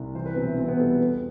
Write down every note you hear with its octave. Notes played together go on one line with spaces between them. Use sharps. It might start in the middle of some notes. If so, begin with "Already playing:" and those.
Already playing: C2
E3 C5
B4
B1 C4
E4
E3 C4
B3
G3 A4
B4
E2